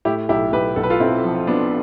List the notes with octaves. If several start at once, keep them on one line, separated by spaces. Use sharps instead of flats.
A2 E4 G4
B1 E4 G4
B1 G4 B4
B1 A4
B4
F4 A4
B1 C4 E4
F3
F3 B3 D4